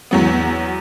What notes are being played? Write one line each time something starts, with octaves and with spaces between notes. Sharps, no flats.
E2 F#3 B3